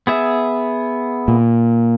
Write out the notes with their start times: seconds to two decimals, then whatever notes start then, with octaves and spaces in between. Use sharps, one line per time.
0.07 B3 G#4 E5
1.28 A#2